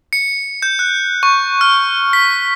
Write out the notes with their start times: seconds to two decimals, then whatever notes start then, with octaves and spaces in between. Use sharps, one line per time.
0.13 C#7
0.62 G6
0.79 F#6
1.23 C#6
1.61 F6
2.13 B6